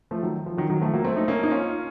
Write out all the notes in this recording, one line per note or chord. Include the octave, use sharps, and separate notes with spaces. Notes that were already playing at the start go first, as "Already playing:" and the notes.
F3 A3
D#3 F#3
F3
D#3 F#3
D#3 F#3
F3 A3
F#3 A#3
A3 C4
D#4
A#3 C#4
D#4
C#4 F4